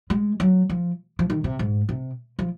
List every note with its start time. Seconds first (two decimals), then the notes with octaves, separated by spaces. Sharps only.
0.10 G#3
0.40 F#3
0.69 F3
1.19 F3
1.30 D#3
1.44 C3
1.59 G#2
1.89 C3
2.39 F3